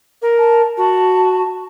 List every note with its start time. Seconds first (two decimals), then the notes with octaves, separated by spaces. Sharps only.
0.22 A#4
0.38 A5
0.77 F#4 A5